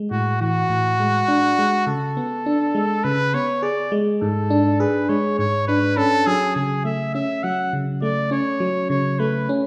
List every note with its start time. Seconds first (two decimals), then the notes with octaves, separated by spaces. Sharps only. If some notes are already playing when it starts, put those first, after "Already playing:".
Already playing: G#3
0.11 A2 F#4
0.41 E3 F#4
0.70 A2
1.00 G#3
1.28 D4
1.59 G#3
1.87 C#3 A4
2.17 B3
2.46 D4
2.75 G#3
3.04 C#3 B4
3.34 B3 C#5
3.62 G#4 D5
3.92 G#3
4.22 G#2 A4
4.50 D4
4.80 G#4 B4
5.09 G#3 C#5
5.38 G#2 C#5
5.68 D4 B4
5.97 C#4 A4
6.27 F#3 G#4
6.56 C#3 G#4
6.85 A3 E5
7.14 C#4 E5
7.43 F#3 F#5
7.73 C#3
8.02 A3 D5
8.31 C#4 C#5
8.60 F#3
8.90 C#3 C#5
9.19 A3 B4
9.49 C#4